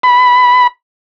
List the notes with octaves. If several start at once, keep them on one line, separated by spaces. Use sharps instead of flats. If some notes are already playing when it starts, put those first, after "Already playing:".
B5